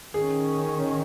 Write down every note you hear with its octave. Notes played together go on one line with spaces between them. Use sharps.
D#3 C#4 G#4